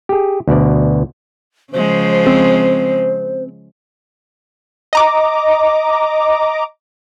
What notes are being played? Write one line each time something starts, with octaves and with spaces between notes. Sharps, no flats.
G4 G#4
D2 B2 D5
C#3 F3 G#3 C5
C4
D#5 A#5 D6